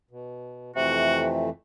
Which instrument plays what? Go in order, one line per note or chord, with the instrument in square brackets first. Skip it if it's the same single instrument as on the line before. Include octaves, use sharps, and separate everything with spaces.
[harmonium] B2
[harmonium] F2 E3 A3 [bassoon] C3 [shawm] F#4